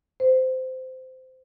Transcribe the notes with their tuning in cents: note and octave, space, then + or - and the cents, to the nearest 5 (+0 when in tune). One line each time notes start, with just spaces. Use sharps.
C5 -20